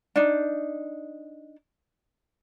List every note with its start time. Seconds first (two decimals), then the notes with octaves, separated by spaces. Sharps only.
0.16 D4 D#4